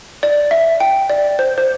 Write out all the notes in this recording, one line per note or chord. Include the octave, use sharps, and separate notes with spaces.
D5
E5
G5
D5
C5
C5